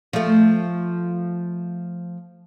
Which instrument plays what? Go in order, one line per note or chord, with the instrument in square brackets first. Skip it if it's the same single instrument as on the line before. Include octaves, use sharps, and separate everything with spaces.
[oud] F3 A3